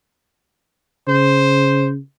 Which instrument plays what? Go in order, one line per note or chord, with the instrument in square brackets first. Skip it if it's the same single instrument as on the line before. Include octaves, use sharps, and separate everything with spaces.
[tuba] C#3 [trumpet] C5